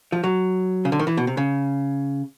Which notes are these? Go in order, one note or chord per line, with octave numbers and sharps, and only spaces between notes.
F3
F#3
C#3
D3
D#3
E3
B2
C3
C#3